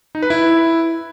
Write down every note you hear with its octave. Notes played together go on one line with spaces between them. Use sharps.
D#4
B4
E4